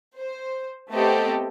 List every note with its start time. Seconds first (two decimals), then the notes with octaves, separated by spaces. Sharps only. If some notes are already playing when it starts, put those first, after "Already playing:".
0.17 C5
0.93 A3 B3 C4 G4 A4 D#5